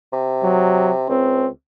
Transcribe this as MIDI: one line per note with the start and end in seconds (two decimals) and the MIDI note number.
0.13 1.08 48
0.43 0.91 54
1.09 1.49 37
1.09 1.48 60